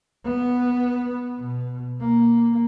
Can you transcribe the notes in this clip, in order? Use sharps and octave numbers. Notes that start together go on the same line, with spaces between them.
B3
B2
A#3